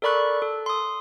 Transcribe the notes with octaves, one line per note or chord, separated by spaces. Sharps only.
A4 A#4 D5 B5 C#6 F#6
A4
C6 D#6